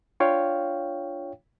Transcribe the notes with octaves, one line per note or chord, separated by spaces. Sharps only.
D4 F4 C#5 F5 G5